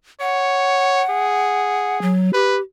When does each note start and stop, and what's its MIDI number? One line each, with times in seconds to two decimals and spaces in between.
0.20 1.03 73
0.20 2.01 78
1.10 2.12 68
2.02 2.33 54
2.33 2.61 67
2.33 2.58 71